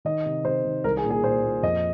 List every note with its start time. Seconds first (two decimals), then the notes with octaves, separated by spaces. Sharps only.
0.05 D#3 D#5
0.26 C3
0.44 C3 C5
0.65 D#3
0.84 C2 A#4
0.97 G#4
1.04 A#2
1.10 G#4
1.24 A#2 C5
1.43 A#2
1.63 F2 D#5